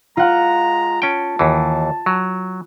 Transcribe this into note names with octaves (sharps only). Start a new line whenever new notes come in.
G#3 F4 F#5 A#5
C#4 G5 A5
D#2 E3
F#3